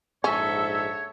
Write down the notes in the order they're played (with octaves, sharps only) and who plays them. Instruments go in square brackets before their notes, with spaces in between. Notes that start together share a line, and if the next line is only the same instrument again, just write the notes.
[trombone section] A#1 G#2 [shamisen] C#4 [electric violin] A4 E5 [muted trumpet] C#5